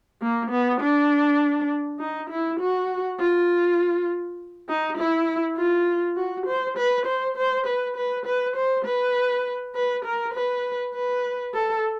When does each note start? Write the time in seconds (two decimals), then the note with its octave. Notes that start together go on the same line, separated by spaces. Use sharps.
0.22 A#3
0.51 B3
0.81 D4
1.99 D#4
2.30 E4
2.60 F#4
3.19 F4
4.69 D#4
4.98 E4
5.57 F4
6.17 F#4
6.47 C5
6.78 B4
7.06 C5
7.37 C5
7.67 B4
7.97 B4
8.26 B4
8.56 C5
8.85 B4
9.75 B4
10.05 A#4
10.34 B4
10.94 B4
11.54 A4